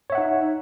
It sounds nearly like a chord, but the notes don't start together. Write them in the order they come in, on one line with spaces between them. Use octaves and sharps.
C#5 E5 F#5 D#4